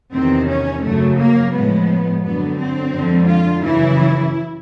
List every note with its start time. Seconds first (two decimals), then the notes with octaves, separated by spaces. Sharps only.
0.13 E2 C3 D#3 C4
0.48 C#4
0.83 F#2 C#3 F#3 A3
1.19 A#3
1.53 A2 F3 G#3 B3
2.23 F#2 D3 F#3 B3
2.58 C4
2.93 F2 D3 F3 G#3
3.28 F4
3.63 F#2 C#3 E3 E4